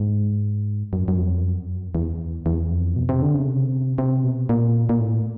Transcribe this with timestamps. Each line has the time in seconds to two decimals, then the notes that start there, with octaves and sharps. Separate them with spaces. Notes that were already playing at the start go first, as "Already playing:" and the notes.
Already playing: G#2
0.93 F#2
1.08 F#2
1.18 F2
1.44 F#2
1.95 E2
2.46 E2
2.71 F2
2.96 B2
3.09 C3
3.22 D3
3.35 C#3
3.47 C3
3.98 C3
4.24 B2
4.49 A#2
4.89 A#2
5.00 A2